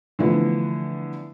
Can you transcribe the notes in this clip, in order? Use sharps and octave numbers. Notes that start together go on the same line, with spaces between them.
D3 E3 F3 A3 B3